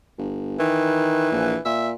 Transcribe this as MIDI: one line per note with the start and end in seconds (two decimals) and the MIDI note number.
0.18 0.56 31
0.59 1.29 51
0.59 1.59 52
1.32 1.56 34
1.65 1.94 46
1.65 1.89 76